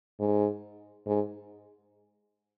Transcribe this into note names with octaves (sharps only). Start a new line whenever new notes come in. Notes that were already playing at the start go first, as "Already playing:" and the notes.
G#2
G#2